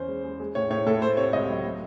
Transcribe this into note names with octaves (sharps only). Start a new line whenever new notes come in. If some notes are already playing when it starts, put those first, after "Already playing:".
Already playing: E2 C#4 C5
G#3
G#3
G#3
A2 C#5
A2 C#5
A2 A4
A3 C5
C3 C#5
C#2 D#5
F#3
A3